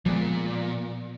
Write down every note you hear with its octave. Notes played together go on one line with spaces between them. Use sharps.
A#2 F3 G#3 B3